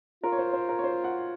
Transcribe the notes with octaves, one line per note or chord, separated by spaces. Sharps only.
F4 A#4
C#5
C5
C5
A#4
C#5
C5
F#5